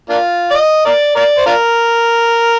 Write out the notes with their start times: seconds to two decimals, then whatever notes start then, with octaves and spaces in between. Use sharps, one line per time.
0.09 A#3 D4 F4
0.51 D5
0.55 D#5
0.85 A#4 D5
1.16 A#4 D5
1.37 C5
1.46 D4 F4 A#4